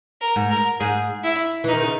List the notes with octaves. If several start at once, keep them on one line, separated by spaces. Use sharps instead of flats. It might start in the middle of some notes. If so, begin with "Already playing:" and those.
A#4
G#2
A#4
G#2 G#4
E4
E3
D#4
D#3
C#3